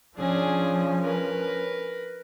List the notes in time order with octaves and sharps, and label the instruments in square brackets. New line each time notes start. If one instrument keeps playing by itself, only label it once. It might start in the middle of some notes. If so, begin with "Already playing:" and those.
[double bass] F3 C#4 [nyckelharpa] D4 G#4
[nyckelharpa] A#4 B4